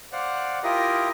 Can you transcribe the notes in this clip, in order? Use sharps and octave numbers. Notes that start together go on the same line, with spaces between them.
C5 D5 F5 F#5
E4 F4 G4 A#4 D#5